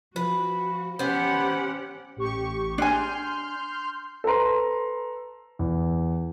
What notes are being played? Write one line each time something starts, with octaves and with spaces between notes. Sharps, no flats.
F3 F#4 B4
B3 C#4 G4 C5 F#5
A1 G4 C#6
D4 G#5 C6 F6 G6
A4 B4 C5 A#5 C6
E2